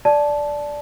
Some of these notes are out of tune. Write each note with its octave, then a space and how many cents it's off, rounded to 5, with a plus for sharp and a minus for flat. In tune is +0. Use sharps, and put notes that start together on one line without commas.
D5 -5 A5 -15